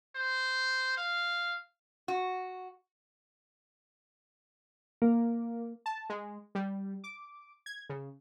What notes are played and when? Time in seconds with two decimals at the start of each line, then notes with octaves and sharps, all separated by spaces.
0.15 C5
0.97 F5
2.08 F#4
5.02 A#3
5.86 A5
6.09 G#3
6.55 G3
7.04 D6
7.66 G#6
7.89 C#3